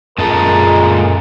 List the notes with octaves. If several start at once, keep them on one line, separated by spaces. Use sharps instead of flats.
F#2 A#2 G#3 A4 A#4 D#5